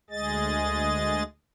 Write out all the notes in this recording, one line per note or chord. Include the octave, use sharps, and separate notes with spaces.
D2 G#3 G#4 D#5 A6